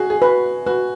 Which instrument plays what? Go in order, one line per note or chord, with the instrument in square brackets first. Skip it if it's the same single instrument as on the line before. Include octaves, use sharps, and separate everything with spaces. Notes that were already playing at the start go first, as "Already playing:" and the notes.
Already playing: [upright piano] F#4 G#4
G#4
[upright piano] F#4 [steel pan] B4
[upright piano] F#4 [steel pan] B4